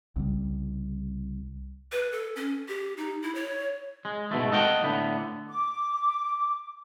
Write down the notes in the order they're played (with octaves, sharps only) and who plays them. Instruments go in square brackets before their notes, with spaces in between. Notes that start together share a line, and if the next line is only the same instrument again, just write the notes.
[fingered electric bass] C2 C#3 G3
[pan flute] B4
A4
C#4
G4
D#4
E4
C#5
[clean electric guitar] G#3
G#2 B2 A3
A4 D#5 F#5 G5
A2 D3 B3
[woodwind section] D6